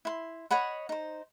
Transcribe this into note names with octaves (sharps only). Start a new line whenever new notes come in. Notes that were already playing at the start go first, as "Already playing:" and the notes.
E4 C6
C#5 D#5 F#5 B5
D#4 C5